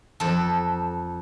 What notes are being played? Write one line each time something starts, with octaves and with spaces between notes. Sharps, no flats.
F2 A4